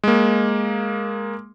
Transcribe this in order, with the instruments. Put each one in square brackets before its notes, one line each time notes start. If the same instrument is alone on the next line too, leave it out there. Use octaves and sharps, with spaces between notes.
[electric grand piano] G#3 A#3